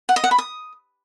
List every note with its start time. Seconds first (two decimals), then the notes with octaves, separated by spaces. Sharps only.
0.09 F#5
0.16 D#5
0.24 F#5
0.31 B5
0.38 D#6